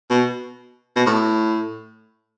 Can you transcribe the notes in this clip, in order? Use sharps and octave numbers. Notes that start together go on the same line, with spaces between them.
B2
B2
A2